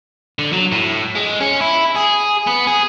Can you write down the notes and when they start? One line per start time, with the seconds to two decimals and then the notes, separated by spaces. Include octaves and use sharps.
0.39 D3
0.53 F#3
0.72 A2
1.15 G#3
1.41 C#4
1.61 E4
1.96 G#4
2.47 B3
2.67 G#4